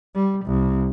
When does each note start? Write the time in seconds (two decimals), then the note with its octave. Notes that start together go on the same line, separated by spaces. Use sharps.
0.15 G3
0.46 C2